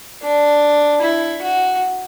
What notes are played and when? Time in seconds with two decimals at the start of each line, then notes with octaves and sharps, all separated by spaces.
0.22 D4
1.02 E4
1.42 F#4